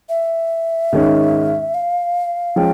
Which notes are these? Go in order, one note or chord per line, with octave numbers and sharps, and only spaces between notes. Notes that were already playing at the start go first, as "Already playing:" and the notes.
E5
G#2 D#3 G#3 C#4
F5
F3 G#3 C#4 F4 G5